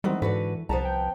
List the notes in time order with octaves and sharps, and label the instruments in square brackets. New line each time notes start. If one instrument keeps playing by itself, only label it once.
[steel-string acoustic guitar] D#3 B3 C4 [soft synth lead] E3 [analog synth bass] G3
[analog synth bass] G#2 [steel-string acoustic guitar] D3 F#4 B4
[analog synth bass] C2 [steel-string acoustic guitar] F3 B3 A#5 [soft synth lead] A5
[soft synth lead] G5